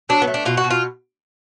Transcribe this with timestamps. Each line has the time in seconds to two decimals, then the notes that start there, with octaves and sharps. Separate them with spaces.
0.09 F#3 D4
0.22 B3
0.27 A3
0.34 D4
0.45 B2 F4
0.57 F#4
0.64 B2
0.70 F4